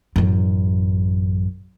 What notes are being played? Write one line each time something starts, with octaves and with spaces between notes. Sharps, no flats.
A1 F#2